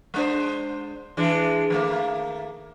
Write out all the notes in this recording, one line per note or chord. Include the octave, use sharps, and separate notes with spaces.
G#3 D4 C5
E3 G#3 D4
D#3 A3 A#3